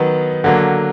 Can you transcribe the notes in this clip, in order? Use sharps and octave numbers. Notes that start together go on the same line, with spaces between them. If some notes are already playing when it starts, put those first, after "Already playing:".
Already playing: D#3 F#3 B3
D3 F#3 A#3